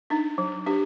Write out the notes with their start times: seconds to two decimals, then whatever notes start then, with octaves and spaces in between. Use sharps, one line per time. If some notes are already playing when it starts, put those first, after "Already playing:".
0.10 D4 D#4
0.38 F#3
0.66 D4 G4